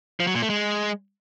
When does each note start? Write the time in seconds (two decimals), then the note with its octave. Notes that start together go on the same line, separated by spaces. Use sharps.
0.20 F3
0.27 F#3
0.35 A#2
0.42 A3
0.50 G#3